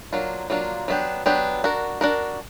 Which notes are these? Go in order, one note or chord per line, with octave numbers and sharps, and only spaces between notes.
F#3 A#3 D4 F4
F#3 A#3 D4 F4
F#3 B3 D4 G4
F#3 B3 D4 G4
D4 F#4 A#4
D4 F#4 A#4